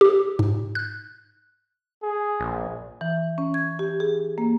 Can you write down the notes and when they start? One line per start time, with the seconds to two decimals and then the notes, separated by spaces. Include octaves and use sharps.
0.01 G4
0.39 G#2
0.75 F#6
2.03 G#4
2.40 A#1
3.01 E3
3.38 C#4
3.54 G#6
3.79 G4
4.00 G#4
4.38 A#3